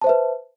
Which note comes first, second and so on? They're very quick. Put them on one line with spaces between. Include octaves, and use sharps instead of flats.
A5 C5 E5 B4